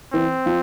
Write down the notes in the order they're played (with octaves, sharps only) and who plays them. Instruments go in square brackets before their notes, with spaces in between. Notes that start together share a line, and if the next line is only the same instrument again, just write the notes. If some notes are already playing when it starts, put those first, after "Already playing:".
[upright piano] E3 [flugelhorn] C4
[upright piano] F3